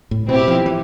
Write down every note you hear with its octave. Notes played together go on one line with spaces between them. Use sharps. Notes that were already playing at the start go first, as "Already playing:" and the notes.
A2
B2 C4 E4 G4
F3
E3